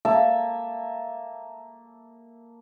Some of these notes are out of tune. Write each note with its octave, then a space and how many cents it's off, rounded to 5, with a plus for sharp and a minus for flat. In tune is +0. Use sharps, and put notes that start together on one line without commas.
A#3 +0 E5 +0 A5 +0